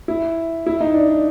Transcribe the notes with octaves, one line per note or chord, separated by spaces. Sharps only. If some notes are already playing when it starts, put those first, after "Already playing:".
E4
E4
D#4
D4
D4